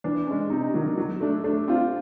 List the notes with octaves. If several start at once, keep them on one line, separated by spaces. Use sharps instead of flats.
E3 D4
G#3 C#4
C3 D#4
D#3 F#3
F#3
A3 D4
A3 D4
C4 F4